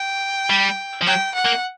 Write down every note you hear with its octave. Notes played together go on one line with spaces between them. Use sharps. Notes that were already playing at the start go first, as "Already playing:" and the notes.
Already playing: G5
G3
F3
F#3 G5
F#5
A#3